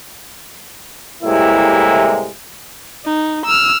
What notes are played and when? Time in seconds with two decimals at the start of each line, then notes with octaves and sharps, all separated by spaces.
1.23 A2 C3 G3 G#3 A#3 E4
3.05 D#4
3.46 E6 F6